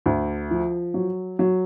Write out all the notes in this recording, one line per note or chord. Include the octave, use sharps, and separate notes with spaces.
D2
F3
F#3
F#3